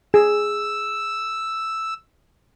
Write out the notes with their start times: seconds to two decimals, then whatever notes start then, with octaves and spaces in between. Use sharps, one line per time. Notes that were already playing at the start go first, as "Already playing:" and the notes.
0.14 G#4 E6